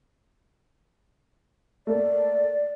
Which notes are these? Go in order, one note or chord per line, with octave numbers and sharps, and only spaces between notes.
A3 A#3 D5